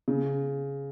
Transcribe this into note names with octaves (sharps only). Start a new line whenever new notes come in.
C#3